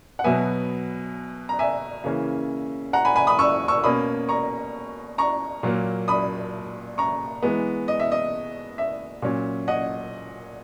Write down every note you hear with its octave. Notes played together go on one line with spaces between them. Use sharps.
F#5
B2 F#3 B3 E5 G#5
A#5
E5 G#5
C#3 E3 A#3 C#4
F#5 A#5
G#5 B5
G#5 B5
B5 D#6
C#6 E6
C#6 E6
B2 A#3 C#4 B5 D#6
A#5 C#6
A#5 C#6
A#2 F#3 A#3
B5 D#6
A#5 C#6
E3 G#3 B3
D#5
E5
D#5
E5
A#2 F#3 C#4
D#5 F#5